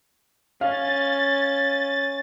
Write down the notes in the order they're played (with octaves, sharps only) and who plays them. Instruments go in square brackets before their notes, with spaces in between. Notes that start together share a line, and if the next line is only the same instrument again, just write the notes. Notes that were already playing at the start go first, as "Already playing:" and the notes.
[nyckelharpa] C#4 [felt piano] F5 [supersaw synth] A6